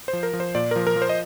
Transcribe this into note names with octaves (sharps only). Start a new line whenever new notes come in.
C5
F3
A#4
F3
C5
A#2 D5
F3 A#4
A#4
F3
C5
D#5